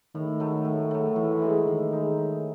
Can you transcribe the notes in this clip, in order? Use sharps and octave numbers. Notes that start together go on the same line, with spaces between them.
A2 D#3
F#3 A3
A2
F#3 A3
A2 E3
G#3 D#4
A2 D#3
G#3 D#4
A2